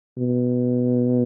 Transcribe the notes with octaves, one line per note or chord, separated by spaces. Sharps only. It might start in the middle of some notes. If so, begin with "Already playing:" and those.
B2